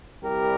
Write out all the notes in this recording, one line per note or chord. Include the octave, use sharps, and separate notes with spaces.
C2 C3 G3 G4 A#4